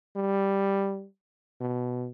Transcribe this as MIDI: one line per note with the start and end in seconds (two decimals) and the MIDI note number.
0.16 1.05 55
1.60 2.09 47